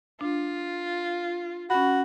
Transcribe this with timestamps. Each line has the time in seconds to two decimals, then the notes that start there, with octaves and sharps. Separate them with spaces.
0.21 D4 F4
1.70 C#4 F#4 B5